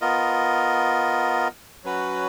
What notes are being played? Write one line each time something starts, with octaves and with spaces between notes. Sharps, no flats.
B3 F4 A#4 D#5
F#3 C#4 F#4 B4